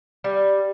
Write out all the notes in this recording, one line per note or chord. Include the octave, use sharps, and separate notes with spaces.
G3